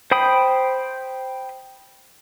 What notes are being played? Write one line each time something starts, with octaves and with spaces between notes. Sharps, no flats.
C5 G5 B5 D#6